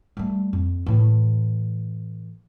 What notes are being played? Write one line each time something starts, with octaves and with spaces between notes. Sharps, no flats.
G3 A3
F2
A2 E3